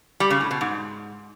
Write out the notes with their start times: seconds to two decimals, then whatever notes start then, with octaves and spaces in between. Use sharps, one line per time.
0.20 G3
0.30 C#3
0.41 A2
0.51 B2
0.61 G#2